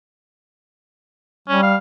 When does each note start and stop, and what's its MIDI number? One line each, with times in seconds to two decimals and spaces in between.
1.48 1.76 55
1.48 1.61 61
1.63 1.76 77